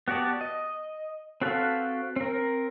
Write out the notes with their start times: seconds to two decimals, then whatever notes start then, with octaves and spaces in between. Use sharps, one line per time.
0.08 B3 F#4 G4 D5 A5
0.41 D#5
1.41 C4 F#4 A4 B4 F5
2.16 C4 A#4